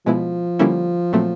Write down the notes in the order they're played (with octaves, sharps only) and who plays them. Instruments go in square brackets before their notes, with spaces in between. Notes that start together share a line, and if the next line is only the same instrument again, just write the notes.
[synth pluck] B2 G#3 B3 E4 [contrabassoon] F3
[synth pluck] D3 G3 A#3 C#4 E4
A#2 F#3 A3 C4